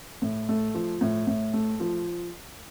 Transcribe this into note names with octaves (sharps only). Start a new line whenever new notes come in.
A2
A3
F3
A2
A2
A3
F3